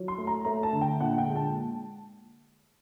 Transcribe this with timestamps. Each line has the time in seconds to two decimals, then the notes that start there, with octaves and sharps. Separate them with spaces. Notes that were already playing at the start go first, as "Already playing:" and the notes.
Already playing: F#3
0.08 C6
0.18 A3
0.27 A#5
0.45 A3 A#5
0.63 A5
0.73 D3
0.81 G5
1.00 A#2 F#5
1.18 G5
1.28 G#3
1.36 A5